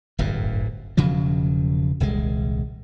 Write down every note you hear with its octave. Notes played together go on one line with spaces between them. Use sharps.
D1 G1 F#2 A2
E1 C#3 F3 F#3
D#1 C2 G#3